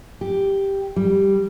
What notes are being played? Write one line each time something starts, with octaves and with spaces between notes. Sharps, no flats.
G4
G3